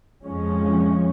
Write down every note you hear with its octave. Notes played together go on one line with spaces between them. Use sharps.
F2 F3 G#3 C#4